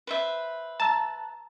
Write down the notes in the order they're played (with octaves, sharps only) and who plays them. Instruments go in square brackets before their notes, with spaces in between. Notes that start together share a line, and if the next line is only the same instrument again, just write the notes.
[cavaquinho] B4 C5 E5
[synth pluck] A5 [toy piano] A#5 E6